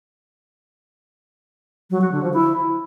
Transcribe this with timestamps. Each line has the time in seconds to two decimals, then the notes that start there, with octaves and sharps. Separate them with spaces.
1.91 F#3
2.01 F#4
2.12 D3
2.23 F3
2.33 E4